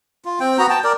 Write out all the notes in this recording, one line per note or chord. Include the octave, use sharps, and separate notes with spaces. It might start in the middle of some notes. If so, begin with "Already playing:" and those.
F4
C4 G5
B3 F#4 A#5
G5 A5
A#4 D5